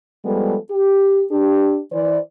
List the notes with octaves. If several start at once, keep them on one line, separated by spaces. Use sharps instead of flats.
F3 G3 G#3 B3 A4
G4
D4 G4
E3 C5 D5